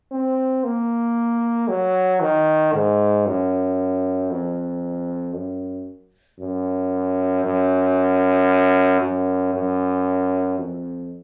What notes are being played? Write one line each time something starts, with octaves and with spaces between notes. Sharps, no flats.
C4
A#3
F#3
D#3
G#2
F#2
F2
F#2
F#2
F#2
F#2
F#2
F2